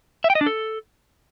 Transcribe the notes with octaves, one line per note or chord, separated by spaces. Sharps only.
E5
G5
D#5
D4
A4